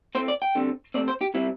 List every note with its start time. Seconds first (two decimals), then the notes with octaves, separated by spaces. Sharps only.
0.15 A2 A3 C4 C5
0.28 D5
0.42 G5
0.55 D3 G3 C4
0.94 C3 A3 C4 D5
1.08 C5
1.21 G4
1.34 C3 G3 C4 E4